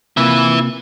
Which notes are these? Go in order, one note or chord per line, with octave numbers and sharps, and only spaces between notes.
C3 A#3 E4 F4 B4